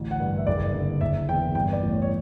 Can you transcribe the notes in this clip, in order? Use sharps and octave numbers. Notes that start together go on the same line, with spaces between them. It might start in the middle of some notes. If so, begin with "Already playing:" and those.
Already playing: A1 D2
F#5
G2
E5
F#1 D5
D3
F#1 E5
E2 G5
G2 G5
D5
A1
C#5
C#5